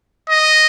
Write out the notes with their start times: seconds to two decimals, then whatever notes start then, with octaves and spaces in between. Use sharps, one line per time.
0.29 D#5